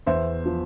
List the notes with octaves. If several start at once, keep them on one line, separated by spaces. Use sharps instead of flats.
E2 C5 E5
F3